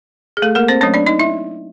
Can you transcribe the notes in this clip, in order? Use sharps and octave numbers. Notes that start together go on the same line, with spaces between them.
G#4
A3 A4
A#3 A#4
C4 C5
F#3 A3 C#4 D4 C#5
D4 D5
D#4 D#5
E4 E5